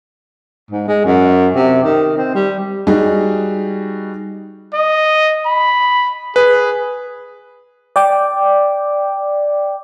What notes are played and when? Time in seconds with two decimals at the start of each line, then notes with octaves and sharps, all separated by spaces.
0.71 G#2
0.88 G#3
1.05 F#2
1.56 C3
1.84 D#3
2.17 C4
2.35 G3
2.87 G3 D#4 F#4 G#4
4.74 D#5
5.46 B5
6.36 G#4 B4
7.96 D5 G5 D6